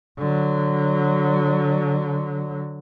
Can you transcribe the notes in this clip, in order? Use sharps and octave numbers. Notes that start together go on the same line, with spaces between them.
D3 F#3